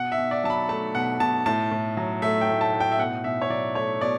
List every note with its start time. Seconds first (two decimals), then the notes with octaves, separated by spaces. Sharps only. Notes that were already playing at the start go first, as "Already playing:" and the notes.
Already playing: B2 F#5
0.12 E5
0.18 B2
0.31 D5
0.44 F#3 A5
0.50 B5
0.69 A3 A5
0.95 B2 F#5
1.20 B2 A5
1.46 A2 A5
1.71 A2
1.97 F#3
2.22 A3 E5
2.41 G5
2.48 A2
2.61 A5
2.73 A2
2.80 G5
2.92 E5
2.99 B2 F#5
3.24 B2 E5
3.42 C#5
3.50 F#3 D5
3.75 A3 C#5
4.01 B2 D5